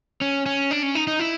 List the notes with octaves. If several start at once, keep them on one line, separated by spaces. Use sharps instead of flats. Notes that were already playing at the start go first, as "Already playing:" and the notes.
C#4
C#4
D4
C#4
D#4
D#4
E4